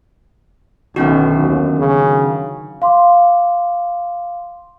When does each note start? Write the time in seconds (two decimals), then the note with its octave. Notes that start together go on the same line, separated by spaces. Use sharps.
0.96 B1 F#2 D3 D#3 B3 C#4 F#4
1.38 D#2
1.78 C#3
2.82 F5 C6 D6